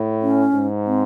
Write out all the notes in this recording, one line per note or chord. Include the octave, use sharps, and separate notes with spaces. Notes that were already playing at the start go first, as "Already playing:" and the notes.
Already playing: A2
C#4
G#2
C4